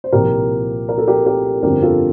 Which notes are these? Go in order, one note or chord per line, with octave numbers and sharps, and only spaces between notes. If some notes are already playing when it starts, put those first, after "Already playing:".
C5
C2 A#2 F3 G4 A#4
A#4
A4
G4 A#4
G4 A#4
G1 F2 D3 F3 G4 A#4
F4 A4